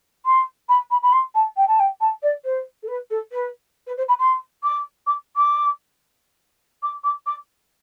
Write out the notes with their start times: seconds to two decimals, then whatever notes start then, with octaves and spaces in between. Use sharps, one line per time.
0.25 C6
0.68 B5
0.90 B5
1.02 B5
1.12 C6
1.34 A5
1.56 G5
1.67 A5
1.79 G5
2.00 A5
2.22 D5
2.44 C5
2.82 A4
2.87 B4
3.10 A4
3.32 B4
3.86 B4
3.97 C5
4.08 B5
4.19 C6
4.63 D6
5.06 D6
5.36 D6
6.82 D6
7.03 D6
7.26 D6